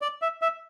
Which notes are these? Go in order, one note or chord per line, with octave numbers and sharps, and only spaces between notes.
D5
E5
E5